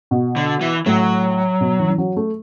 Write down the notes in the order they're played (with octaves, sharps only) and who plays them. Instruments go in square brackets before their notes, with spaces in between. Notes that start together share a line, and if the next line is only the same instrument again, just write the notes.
[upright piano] B2
[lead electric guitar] D3
E3
[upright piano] A2 [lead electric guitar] F#3
[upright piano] B2
E3
E3
F#3
A3